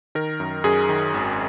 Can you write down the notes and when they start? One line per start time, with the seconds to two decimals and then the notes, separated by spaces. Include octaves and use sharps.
0.15 D#3 A#4
0.40 F#2
0.64 F#2 G#4
0.89 D#3
1.14 G#1